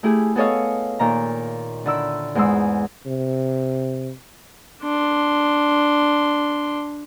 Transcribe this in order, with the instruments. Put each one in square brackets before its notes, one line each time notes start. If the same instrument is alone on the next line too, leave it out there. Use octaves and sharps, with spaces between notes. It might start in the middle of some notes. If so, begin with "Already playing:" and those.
[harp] A3 E4 G4 G#4
B3 G#4 A4 C#5 D#5 F5
A#2 D#3 A#5
D3 D#3 E4 E6
E2 G#2 G#3 C6 E6
[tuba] C3
[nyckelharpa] D4 C6